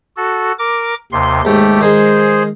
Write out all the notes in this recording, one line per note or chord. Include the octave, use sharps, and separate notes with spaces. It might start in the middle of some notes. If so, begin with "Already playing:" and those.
F#4 A4
A#4 D6
D#2 C3 C6
D#2 G#2 A3 G4
D#3 G#3 G#4 C5